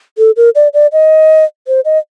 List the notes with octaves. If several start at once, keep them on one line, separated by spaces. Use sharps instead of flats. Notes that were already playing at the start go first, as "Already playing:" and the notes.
A4
A#4
D5
D5
D#5
C5
D#5